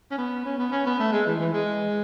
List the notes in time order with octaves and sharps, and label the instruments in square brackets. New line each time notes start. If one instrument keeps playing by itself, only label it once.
[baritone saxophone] C#4
B3
C#4
B3
C#4
B3
A3
G#3
E3
E3
G#3